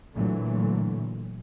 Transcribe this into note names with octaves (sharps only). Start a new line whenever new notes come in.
A#2 D3 E3 F#3 A3